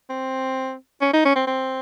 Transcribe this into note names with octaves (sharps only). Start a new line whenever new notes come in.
C4
C#4
D#4
C#4
C4
C4